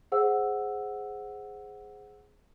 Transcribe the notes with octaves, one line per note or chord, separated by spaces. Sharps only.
G#4 C5 F#5 E6